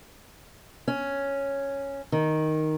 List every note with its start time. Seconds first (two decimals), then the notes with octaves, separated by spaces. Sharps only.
0.88 C#4
2.12 D#3